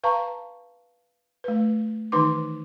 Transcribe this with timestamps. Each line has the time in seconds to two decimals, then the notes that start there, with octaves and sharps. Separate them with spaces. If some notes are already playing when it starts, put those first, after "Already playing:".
0.04 B4 F5 A5 A#5 C#6
1.44 A3 B4
2.12 D#3 E3 D#4 B4 C6 D6